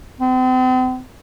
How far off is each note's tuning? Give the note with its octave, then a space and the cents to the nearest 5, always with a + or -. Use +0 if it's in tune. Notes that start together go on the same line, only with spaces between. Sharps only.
C4 -40